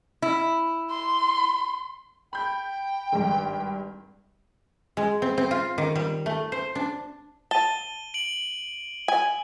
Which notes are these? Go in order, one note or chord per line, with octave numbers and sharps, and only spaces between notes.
E4
C6
G5 B5 G6
G#1 G2
G#3
C4
C4
F4
D#3
G3
A3
C5
D4
A5 D#7 G7
D7 F#7
G#5